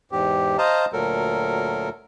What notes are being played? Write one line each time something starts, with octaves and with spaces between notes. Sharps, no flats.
E2 G#2 G4
C5 D#5 F5 A5 A#5
D2 A#2 F#3 A4 A#4